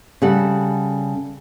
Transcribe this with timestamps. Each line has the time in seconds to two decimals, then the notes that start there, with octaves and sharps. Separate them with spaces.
0.22 C#3 G3 A4 F#5